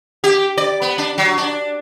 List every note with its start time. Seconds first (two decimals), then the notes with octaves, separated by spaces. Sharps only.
0.24 G4
0.58 D5
0.82 B3
0.98 D4
1.18 F#3
1.38 D4